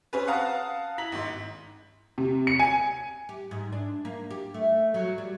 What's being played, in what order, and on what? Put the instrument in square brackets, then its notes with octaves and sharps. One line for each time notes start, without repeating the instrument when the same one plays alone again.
[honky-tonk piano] C4 C#4 G#4 B4
F5 F#5 A5 A#5 D#6
E4 A#5 B6 F#7
G#1 G#2
C3
C#7
G#5
[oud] G4
G#2
D4
A#3
G4
A3
F#3
G3